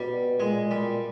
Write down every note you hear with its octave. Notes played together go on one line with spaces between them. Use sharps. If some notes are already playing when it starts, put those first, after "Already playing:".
Already playing: B2 G3
A#2 G#3
G3